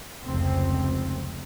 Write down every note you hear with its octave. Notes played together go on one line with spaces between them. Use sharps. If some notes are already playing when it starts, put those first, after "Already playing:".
F1 C#2 C4